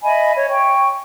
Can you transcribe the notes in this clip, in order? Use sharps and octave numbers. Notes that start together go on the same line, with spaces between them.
D#5 E5 G#5 B5
C#5
G5 C#6